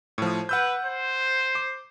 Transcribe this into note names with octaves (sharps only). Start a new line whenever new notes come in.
A2 F3
B4 F#5 E6 G6
C5
D6